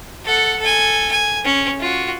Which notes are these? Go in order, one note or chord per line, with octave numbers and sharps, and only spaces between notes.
A4 F#5
A4 G#5
G#5
C#4
F4 F#4